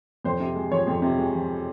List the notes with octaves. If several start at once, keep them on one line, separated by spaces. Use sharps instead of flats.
F2 C5
C3
G#3
F3 C#5
F2
C3
G#3
F3